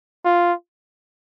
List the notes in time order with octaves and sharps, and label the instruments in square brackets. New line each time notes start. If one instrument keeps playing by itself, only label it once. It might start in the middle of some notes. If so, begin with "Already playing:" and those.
[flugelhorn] F4